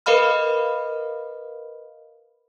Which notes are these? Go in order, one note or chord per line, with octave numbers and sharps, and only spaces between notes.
A#4 B4 D#5 F5 B5 F6